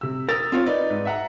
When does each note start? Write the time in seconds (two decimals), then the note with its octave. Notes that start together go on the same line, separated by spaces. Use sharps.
0.01 C3 E6
0.29 A#4 D#6 E6 A6
0.52 C4 F4 C#5
0.66 D#4 B4 D5
0.90 G#2
1.05 E5 F#5 A#5